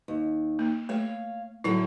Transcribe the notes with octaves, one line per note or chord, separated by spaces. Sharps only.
D#2
A#3
A3 C#5 F5
A2 D3 F#3 E4